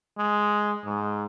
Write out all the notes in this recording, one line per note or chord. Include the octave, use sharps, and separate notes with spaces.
G#3
G#2